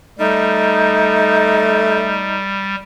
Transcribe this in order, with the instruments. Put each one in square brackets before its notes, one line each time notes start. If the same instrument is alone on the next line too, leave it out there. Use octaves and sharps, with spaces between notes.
[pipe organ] G3 [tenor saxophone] A3 [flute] D#4